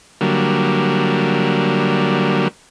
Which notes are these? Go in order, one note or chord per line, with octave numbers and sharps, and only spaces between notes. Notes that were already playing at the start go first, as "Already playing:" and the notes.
D3 F#3 G3 A#3